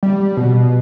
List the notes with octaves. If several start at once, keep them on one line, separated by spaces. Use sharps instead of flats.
G3
B2